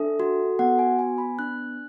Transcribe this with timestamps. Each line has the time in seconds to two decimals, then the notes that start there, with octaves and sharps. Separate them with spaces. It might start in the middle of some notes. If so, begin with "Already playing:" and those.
Already playing: D4 A4 E5
0.20 F#4
0.59 B3 F#5
0.79 G#5
0.99 B3 G#5
1.18 B5
1.39 D4 F#6